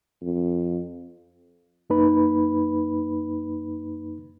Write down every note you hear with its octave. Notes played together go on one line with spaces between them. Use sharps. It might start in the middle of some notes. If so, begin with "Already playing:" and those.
F2
F#2 A#3 D#4 B4 B5